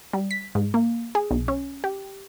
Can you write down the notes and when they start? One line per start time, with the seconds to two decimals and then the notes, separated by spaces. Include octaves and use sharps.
0.13 G3
0.31 B6
0.55 G#2
0.74 A#3
1.15 G#4
1.31 B1
1.48 C#4
1.84 G4